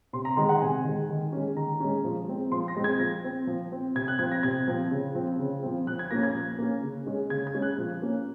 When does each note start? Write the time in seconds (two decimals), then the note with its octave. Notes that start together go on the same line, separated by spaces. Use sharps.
0.13 C3 C6
0.25 A#5
0.36 D#3 G#3 C6
0.49 F#5
0.61 C3 G#5
0.85 D#3 G#3
1.09 D#3
1.32 G#3 C#4
1.57 D#3 A#5
1.80 G#3 C#4
2.04 F3
2.28 G#3 C4
2.52 F3 C6
2.68 A#6
2.76 G#3 C4
2.84 G#6
2.99 F3 A#6
3.24 C4
3.47 F3
3.72 C4
3.95 C3 G#6
4.08 F#6
4.19 F3 C4 G#6
4.32 A#6
4.43 C3 G#6
4.68 F3 C4
4.91 C#3
5.15 F3 C4
5.39 C#3
5.63 F3 C4
5.87 F3 F#6
5.99 G#6
6.11 A#3 C#4 A#6
6.23 G#6
6.35 F3
6.59 A#3 C#4
6.82 C#3
7.07 G#3 C#4
7.30 C#3 G#6
7.47 G#6
7.54 G#3 C#4
7.62 F#6
7.78 F3
8.02 A#3 C#4